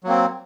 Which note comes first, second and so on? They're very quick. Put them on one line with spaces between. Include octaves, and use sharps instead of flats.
F#3 A#3 C4